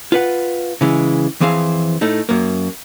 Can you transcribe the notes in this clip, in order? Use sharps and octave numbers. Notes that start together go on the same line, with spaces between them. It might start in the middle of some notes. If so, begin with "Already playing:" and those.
F4 B4 F#5
C#3 E3 G#3
F2 E3 C4 G#4 F5
A2 A3 D#4
F#2 A#3